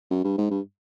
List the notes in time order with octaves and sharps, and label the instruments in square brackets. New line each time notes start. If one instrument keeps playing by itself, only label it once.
[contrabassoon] F#2
G2
G#2
G2